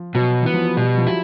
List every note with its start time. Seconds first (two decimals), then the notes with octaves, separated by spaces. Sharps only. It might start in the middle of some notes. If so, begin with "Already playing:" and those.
Already playing: F3
0.14 B2 F#3
0.42 E3 B3
0.53 F3
0.65 F#3
0.76 B2 G3
0.98 F3
1.07 F#3 E4